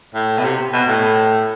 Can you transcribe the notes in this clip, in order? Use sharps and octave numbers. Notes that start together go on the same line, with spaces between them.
A2
B2
C3
B2
A2